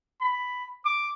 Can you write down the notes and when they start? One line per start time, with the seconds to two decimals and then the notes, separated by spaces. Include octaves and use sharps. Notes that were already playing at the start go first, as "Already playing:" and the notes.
0.21 B5
0.86 D6